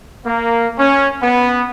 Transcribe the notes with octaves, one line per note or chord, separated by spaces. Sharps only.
A#3
C#4
B3